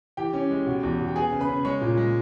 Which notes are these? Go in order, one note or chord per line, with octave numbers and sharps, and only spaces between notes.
E3 G4 G5
C#4
G#3
B2
E2
B2
G5
B3 G#4 G#5
C#3
B4 B5
C#3
G#3 C#5 C#6
A#2
G#3